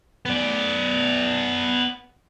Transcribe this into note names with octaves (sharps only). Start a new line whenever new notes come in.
B3 D5